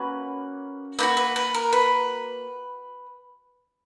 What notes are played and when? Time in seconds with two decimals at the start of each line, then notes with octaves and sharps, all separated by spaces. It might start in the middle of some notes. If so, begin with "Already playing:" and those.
Already playing: A#3 C#4 F#4 B4
0.99 A#3 D#4 F#4 B4
1.17 B4
1.36 B4
1.54 A#4
1.73 B4